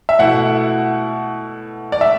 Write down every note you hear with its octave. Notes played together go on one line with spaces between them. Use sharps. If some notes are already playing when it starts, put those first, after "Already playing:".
E5
B2 A3 E4 F#5
D5
E5